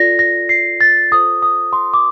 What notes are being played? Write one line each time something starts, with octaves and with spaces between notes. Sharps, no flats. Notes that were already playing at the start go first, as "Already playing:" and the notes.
Already playing: F4 A4 D5 A#6
A#6
C7
A6
F4 A4 C5 D#6
D#6
C6
D6